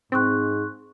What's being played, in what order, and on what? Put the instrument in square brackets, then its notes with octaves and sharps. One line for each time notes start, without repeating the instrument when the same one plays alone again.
[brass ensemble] G#2 [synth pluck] C4 [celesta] C6 C#6 F#6